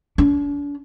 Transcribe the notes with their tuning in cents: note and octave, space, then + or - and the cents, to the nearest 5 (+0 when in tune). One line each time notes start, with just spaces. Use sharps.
D4 -40